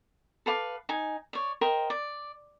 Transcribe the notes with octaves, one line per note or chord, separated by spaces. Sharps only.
A4 B4 F5 D6
D#4 G#5
C#5 D5
A#4 C5 D#5 G5
D5